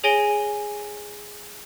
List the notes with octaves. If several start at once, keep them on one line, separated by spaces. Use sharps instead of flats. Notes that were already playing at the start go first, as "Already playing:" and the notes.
G#4 C#5 G#5 A#6 D7 G7